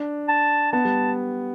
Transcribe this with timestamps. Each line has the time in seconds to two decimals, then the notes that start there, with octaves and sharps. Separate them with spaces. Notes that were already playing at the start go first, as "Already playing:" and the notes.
Already playing: D4
0.28 A5
0.73 B3 A5
0.85 G3